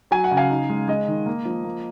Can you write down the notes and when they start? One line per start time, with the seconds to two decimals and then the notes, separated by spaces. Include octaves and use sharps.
0.11 F#3 G#5
0.24 F#5
0.31 C#3
0.37 F5 G#5
0.50 D#4
0.69 G#3
0.88 G#3 D#5
1.08 D#3
1.26 A#3
1.45 F3
1.64 A#3